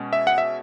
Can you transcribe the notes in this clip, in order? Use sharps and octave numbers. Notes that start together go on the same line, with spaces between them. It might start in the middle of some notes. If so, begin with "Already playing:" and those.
Already playing: B2 G#3 C#4
E5
F#5
E5